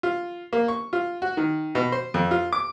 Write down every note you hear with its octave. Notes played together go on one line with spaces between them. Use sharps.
F4
A#3
C#6
F4
F#4
D#3
B2
C5
F2
F4
D6